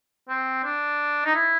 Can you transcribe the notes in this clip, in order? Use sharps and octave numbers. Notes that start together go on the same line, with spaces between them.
C4
D4
D#4
E4